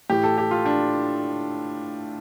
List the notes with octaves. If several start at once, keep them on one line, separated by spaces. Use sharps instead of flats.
A2 E3 G4
A4
G4
F4
D4